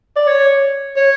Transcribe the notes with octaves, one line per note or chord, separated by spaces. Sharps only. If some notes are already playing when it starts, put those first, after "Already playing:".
D5
C#5
C#5